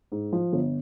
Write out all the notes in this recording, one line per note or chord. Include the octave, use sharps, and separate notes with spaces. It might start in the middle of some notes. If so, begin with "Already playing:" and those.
G#2
F3
G1